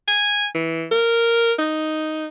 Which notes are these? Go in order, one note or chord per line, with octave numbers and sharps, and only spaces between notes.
G#5
E3
A#4
D#4